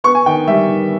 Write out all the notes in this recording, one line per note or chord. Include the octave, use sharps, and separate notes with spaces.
B3 C#6
G#5
D#3 G5
G3 E5
D#3